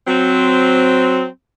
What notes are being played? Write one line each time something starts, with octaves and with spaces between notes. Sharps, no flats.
F#3 C4